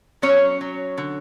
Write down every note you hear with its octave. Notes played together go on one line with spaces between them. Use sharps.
F#3 C#4 C#5
F#3
D3